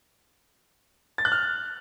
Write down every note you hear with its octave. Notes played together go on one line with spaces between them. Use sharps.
A6
F#6
F6